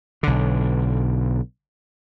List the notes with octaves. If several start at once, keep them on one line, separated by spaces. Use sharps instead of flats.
B1 D3